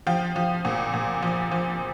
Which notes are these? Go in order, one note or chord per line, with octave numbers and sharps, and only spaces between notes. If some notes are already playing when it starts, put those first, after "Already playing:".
F3 F5 G5
F3
A#2
A#2
F3
F3